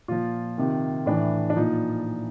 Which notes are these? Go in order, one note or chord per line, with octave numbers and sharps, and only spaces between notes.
A#2 F3 F4
C3 D#3
A2 E3 D4
D4
A#2 F3 D#4